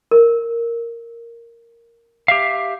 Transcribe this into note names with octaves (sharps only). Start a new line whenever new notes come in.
A#4
G4 E5 F5